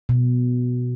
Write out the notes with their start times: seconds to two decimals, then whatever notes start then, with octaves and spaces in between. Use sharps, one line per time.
0.09 B2